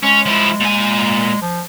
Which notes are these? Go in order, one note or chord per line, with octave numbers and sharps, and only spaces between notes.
G#3 C#4
F3 E4
A#2 G#5
F3